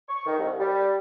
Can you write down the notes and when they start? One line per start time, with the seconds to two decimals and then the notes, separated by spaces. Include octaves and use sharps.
0.09 C#6
0.26 D#3
0.38 C2
0.60 G3